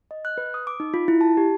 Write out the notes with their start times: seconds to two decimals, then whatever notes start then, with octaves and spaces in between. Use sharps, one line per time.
0.11 D#5
0.25 F#6
0.38 B4
0.54 D#6
0.67 D6
0.80 D#4
0.94 F4
1.08 E4
1.21 A5
1.37 G4